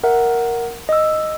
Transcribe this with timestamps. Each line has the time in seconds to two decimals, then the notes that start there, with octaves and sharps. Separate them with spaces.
0.04 A#4 E5 F#5
0.89 D#5 E6